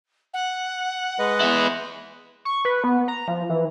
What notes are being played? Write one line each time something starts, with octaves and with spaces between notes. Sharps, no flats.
F#5
G#3 B4 D#5
B3 E4
C#6
B4
B3
A#5
F3
E3